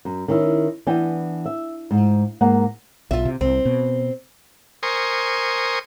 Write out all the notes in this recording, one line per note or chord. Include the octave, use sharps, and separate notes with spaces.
F#2
D#3 C#4 E4
E3 B3 D4 G5 G#5
E5
G#2
G#2 A#3 F#5
B1 F4 E5
C3
C2 C4
B2
A#4 C5 G#5 C6 C#6 D#6